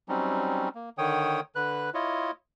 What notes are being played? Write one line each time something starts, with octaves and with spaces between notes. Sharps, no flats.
F#3 G3 C4 C#4 D#4
A#3
D3 D#3 C#5 G5 D#6
D3 B4 F#6
E4 F4 C#5 D#5